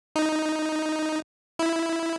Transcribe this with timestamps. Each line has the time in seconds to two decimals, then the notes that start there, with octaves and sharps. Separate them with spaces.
0.16 D#4
1.59 E4